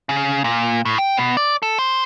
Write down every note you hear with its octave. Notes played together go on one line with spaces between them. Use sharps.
C#3
A#2
A2
G5
B2
D5
A4
C5